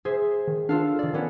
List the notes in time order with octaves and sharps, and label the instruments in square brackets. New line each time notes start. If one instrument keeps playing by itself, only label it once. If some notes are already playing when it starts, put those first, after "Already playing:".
[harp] G#4 C5 E5
[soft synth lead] D#3
[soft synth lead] D4 [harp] F4 A4 F5
[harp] D#3 A4 [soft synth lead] D5
[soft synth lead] D#3 [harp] B3 C#4 D4